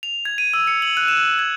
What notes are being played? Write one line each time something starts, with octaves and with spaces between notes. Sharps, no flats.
F7
G#6
D#7
E6
C#7
F#7
F#6
E7
G#6